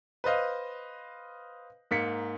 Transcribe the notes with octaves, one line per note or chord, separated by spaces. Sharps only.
B4 C5 D#5 F5
G#2 A#3 B6 C#7